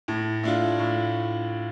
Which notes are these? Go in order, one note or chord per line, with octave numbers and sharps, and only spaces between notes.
A2
A3 D4 F4
A2